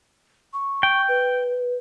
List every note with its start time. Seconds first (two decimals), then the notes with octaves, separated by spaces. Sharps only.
0.53 C#6
0.83 G5
1.09 B4